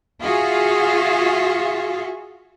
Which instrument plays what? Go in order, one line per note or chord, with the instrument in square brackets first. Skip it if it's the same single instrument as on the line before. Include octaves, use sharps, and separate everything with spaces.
[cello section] F4 F#4 G#4 E5 F5